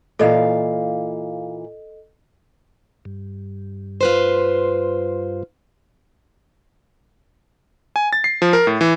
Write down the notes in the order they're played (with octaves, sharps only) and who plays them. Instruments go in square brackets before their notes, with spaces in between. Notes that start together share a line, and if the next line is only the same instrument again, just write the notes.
[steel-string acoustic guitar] A#2 E3 F5 [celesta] A4 D#5
[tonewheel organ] G2
[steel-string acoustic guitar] F4 B4 C5
[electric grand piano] G#5
A6
C7
F3
A#4
A2
E3